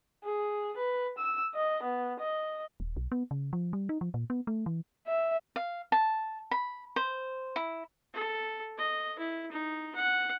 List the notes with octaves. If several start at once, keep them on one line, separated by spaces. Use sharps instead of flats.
G#4
B4
E6
D#5
B3
D#5
D#1
B1
B3
C#3
F3
G3
D#4
F3
A#2
B3
A3
E3
E5
F5
A5
B5
C5
E4
A4
D#5
E4
D#4
F#5